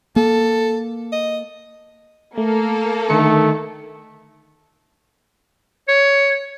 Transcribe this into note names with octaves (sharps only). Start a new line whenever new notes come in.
A#3 A4
D#5
A3 A#3 A4
D3 D#3 A3 C#7
C#5